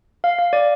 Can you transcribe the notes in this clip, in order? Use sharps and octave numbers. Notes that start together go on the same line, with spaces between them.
F5
F5
D5